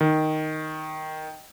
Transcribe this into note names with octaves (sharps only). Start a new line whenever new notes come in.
D#3